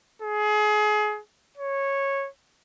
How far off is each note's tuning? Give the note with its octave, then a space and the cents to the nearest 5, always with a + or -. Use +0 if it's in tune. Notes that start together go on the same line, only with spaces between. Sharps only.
G#4 +30
C#5 -10